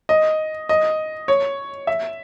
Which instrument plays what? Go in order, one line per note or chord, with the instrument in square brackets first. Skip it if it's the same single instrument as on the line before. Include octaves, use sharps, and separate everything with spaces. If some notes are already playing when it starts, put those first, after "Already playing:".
[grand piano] D#5
D#5
C#5
E5